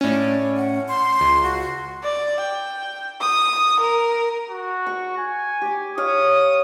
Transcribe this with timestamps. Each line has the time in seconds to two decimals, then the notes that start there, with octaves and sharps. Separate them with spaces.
0.01 A2 C#4 D5
0.56 F#5
0.88 C6
1.21 C#2
1.43 F#4
2.03 D5
2.40 G5
3.21 D#6
3.79 A#4
4.50 F#4
4.86 C#6
5.18 G#5
5.62 G4 D6
5.97 C#5 F5 C#6 D#6